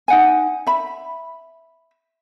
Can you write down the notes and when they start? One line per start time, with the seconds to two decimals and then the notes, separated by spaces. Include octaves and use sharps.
0.08 D#4 F#5 G#5
0.67 E5 B5